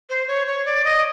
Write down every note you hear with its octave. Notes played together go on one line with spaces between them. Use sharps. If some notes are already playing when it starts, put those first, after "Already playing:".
C5
C#5
C#5
D5
D#5